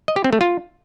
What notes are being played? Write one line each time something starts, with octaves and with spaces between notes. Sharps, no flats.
D#5
G4
C4
A3
F4